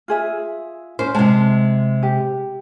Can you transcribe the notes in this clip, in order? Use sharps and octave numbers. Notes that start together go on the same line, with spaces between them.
F4 G#4 E5
C#4 C5
C3 G#3 A5
G4